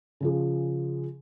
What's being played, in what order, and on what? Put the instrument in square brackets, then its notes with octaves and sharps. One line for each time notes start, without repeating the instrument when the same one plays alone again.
[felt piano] C#3 F3 G#4